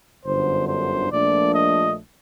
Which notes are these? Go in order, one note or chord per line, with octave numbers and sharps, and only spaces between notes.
G1 F#2 D3 C5
C5
A#1 A#2 A3 D4 D5
D#5